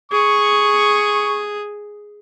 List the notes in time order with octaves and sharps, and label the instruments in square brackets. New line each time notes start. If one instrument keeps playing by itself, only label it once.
[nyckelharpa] G#4 [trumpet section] C#6